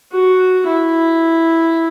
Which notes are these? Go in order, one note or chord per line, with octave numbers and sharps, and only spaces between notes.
F#4
E4